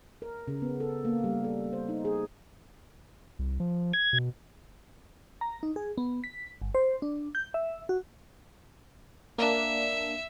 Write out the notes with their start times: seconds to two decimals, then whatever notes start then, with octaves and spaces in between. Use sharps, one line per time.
0.22 A#4
0.48 C#3
0.62 B3
0.80 A4
1.05 A#3
1.24 G3
1.44 A4
1.73 C5
1.89 D#4
2.05 G#4
3.39 C2
3.60 F3
3.93 G#6
4.13 B2
5.41 A#5
5.63 D#4
5.76 G#4
5.98 B3
6.24 B6
6.61 G1
6.75 C5
7.02 D4
7.35 G6
7.54 E5
7.89 F#4
9.38 A#3 D4 E5